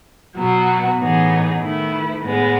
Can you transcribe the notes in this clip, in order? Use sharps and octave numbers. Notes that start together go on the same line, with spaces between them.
B2 F#3 B3 F#4
A2 E3 B3 D#4 G#4
D#3 A3 E4 B4
A2 G#3 B3